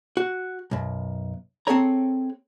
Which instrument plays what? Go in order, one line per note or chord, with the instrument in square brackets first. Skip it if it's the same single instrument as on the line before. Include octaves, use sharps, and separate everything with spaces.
[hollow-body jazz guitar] F#4
B1 F#2
C4 F4 G#4 A4 C#5 A#5